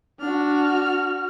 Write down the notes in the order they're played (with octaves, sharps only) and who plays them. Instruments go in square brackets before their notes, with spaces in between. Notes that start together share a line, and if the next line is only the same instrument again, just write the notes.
[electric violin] D4 [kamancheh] F#4 F6